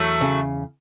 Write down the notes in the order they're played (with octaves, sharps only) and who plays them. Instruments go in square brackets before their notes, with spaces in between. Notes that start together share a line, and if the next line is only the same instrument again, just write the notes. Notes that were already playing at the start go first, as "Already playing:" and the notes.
Already playing: [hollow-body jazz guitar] E2 [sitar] F#3 A3
[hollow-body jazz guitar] C#3